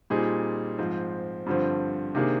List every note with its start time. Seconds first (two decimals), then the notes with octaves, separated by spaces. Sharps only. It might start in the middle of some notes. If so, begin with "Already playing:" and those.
0.10 A#2 G3 C4 D#4 G#4
0.78 G#2 F3 C4
1.46 G2 D3 F3 C4
2.15 C3 D#3 A#3 D4 G#4